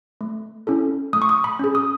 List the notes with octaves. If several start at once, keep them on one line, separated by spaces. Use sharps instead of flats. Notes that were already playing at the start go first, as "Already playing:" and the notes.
A3
C#4 E4 A4
A3 D#6
C#6
D#6
B5
C#4 G#4
D#6